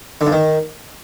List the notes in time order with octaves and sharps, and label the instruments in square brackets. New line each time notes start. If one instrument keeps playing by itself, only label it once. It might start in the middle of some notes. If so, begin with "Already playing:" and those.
[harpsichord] D3
G2
D#3